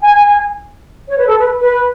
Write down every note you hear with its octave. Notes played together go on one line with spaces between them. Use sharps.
G#5
C#5
B4
A4
B4
B4